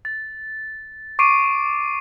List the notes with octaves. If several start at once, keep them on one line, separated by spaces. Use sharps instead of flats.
A6
C#6 D6 C7 D7 D#7